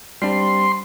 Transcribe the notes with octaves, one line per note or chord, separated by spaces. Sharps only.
G3 C4 D4 C6